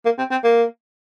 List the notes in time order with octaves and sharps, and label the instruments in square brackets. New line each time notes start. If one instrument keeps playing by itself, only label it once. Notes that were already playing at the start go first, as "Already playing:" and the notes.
[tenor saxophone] A#3
C4
C4
A#3